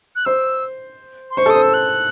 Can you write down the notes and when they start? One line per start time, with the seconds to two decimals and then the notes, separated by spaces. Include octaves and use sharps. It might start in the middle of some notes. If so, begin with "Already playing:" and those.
0.16 F#6
0.25 C5 E6
1.31 C6
1.37 C5 C#6
1.46 A4
1.50 C5 D#6
1.62 E6
1.74 F#6